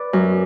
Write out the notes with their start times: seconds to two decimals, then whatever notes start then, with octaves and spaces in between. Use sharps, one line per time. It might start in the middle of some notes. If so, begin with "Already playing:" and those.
Already playing: B4 D5
0.13 F#2